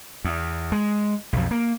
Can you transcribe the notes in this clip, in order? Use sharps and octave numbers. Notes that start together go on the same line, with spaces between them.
E2
G#3
B1 F2
A#3